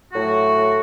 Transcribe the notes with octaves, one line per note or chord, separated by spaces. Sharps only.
A2 F#3 A3 F#4